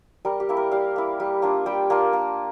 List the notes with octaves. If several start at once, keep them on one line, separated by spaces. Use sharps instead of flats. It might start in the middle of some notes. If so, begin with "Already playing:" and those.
G3 A#4
G4
A#3 E4
A#4
G3 F5
A#3 E4
G3
A#3 D4 F4
G3 G5
A#3 D4 F4
A#3